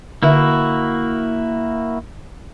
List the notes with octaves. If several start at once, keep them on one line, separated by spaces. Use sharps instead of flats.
D3 A#3 E4 F#4 E5